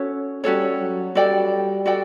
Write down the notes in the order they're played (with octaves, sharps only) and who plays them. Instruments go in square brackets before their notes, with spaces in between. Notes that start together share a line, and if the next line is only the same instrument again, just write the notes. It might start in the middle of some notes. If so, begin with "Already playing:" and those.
Already playing: [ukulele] C#4 F#4 A4 C#5
[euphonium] G3 [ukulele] C#4 F#4 A4 C#5
[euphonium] F#3
[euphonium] G3 [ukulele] F#4 A4 D5 G5
[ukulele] F#4 A4 D5 G5